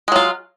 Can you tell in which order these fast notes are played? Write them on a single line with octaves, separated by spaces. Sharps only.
G#3 F#3 F4